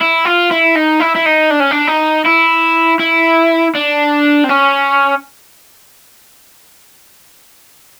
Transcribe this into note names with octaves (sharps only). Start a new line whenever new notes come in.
E4
F4
E4
D#4
E4
E4
D#4
D4
C#4
D4
D#4
E4
E4
D4
C4
C#4